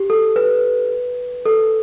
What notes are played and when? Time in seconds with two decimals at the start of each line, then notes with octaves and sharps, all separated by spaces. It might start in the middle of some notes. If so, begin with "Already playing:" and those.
Already playing: G4
0.10 A4
0.36 B4
1.46 A4